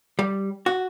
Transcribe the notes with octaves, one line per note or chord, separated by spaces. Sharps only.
G3
F#4